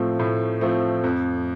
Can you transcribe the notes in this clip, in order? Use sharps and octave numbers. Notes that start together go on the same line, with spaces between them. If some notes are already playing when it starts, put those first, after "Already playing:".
Already playing: A2 F3 A3 C4
A2
F3 A3 C4
F2